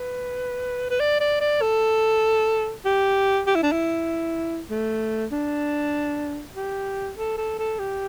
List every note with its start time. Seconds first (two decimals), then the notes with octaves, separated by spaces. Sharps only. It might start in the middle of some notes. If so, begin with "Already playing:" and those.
Already playing: B4
0.90 B4
1.00 D5
1.20 D5
1.41 D5
1.62 A4
2.85 G4
3.47 G4
3.55 E4
3.63 D4
3.72 E4
4.70 A3
5.32 D4
6.56 G4
7.18 A4
7.38 A4
7.59 A4
7.79 G4